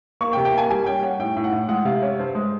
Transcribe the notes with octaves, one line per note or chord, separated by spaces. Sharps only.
A#3 C#6
G5
C3
G5
A#3 G#5
G3 G#5
C#4 G5
C#4 F#5
A2 G5
A2
F#5
A2
G#3 F#5
C3 F5
C#4 C#5
G2 C5
G#3